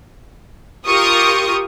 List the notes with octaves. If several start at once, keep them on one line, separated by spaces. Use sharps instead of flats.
F4 G4 A#4 C#6 D#6